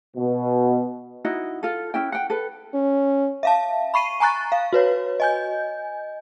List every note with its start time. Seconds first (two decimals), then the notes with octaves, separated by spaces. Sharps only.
0.17 B2
1.25 D#4 E4 F#4 D#5
1.63 F4 A4
1.94 C#4 E4 G5
2.12 F#5 G5
2.30 A4 B4
2.74 C#4
3.43 E5 F5 A5
3.94 B5 C#6 C7 D#7
4.20 G#5 A#5 C#6 F#6 A6
4.52 F5
4.73 F#4 B4 C#5
5.20 D#5 G#5 G6